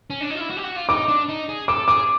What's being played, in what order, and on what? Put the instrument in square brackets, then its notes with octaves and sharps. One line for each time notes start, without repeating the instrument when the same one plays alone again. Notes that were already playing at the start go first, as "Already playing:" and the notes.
[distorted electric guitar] C#4
D4
D#4
F4
E4
F#4
G4
F#4
F4
[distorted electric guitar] D#4 [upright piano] D6
[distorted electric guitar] D4
D#4
G#4
[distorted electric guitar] A4 [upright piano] D6
[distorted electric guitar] G#4 [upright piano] D6